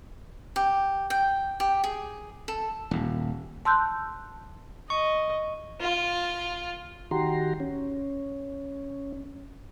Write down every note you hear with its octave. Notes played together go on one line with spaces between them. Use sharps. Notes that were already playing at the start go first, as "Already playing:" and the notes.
G4
G5
G4
G#4
A4
D#1
A5 C6 E6 F#6 G6
D#5 C#6
F4
D#3 F#4 G4 A#5 C6
C#4